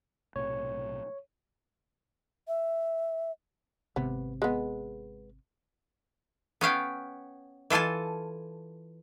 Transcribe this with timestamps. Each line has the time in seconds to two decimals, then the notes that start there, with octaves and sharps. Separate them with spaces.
0.36 B1 A2 C3 C#5
2.48 E5
3.96 G#1 C3 B3
4.42 G#3 B3
6.61 B3 C#4 F5 G5
7.70 E3 F4 A4 G#5 A5